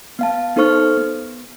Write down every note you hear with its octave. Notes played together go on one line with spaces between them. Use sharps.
B3 F5 A5
B3 D#4 A4 C5 C#6 F6
B3